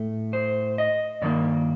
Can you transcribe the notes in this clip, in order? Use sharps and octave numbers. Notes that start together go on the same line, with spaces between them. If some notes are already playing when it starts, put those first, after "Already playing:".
Already playing: A2 A3
C5
D#5
G2 D#3 A#3 D5